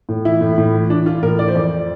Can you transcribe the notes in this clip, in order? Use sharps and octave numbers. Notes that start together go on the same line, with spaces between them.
A2
E3 E4
A2
A2
E3
E3 D4
E3 F4
A2 A#4
E3 D5
C5
F2 D5
F3